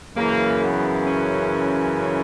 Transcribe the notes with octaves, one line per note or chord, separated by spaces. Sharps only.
F#2 C#3 E3 A#3
B3
C#4